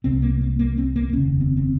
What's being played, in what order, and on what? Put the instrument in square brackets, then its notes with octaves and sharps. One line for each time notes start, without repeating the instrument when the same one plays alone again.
[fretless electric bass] C2 C3 C4
A#3
A#3
A#3
C4
A#3
F1 D#2 C#3 C#4
C4
C4